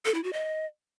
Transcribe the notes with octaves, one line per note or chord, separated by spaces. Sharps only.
A4
E4
F#4
D#5